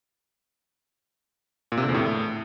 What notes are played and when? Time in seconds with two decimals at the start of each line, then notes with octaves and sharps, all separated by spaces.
1.72 A#2
1.77 C3
1.83 D3
1.89 E2
1.94 A2